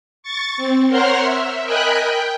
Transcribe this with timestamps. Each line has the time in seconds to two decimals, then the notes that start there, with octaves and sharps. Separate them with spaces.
0.23 C#6 A6
0.57 C4
0.88 A#4 C5 C#5 F#5 C6 F6
1.21 E5
1.64 A#4 D#5 G5 G#5 B5 F#6
2.03 G5